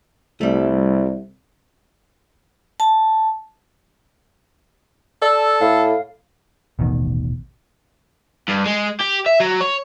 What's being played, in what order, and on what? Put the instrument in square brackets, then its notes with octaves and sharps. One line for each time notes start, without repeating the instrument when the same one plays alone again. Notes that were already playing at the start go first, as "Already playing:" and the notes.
[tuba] C2 [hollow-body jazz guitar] G3 A3
[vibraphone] A5
[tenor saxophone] A4 [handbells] D5 A5 E6
[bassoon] A2 [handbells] F5
[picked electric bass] D#1 A1 B2 D#3
[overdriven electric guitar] G2
G#3
G4
E5
F#3
C#5